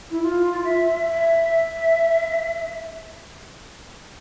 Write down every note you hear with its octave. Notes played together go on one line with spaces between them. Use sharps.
E4
F4
E5
E5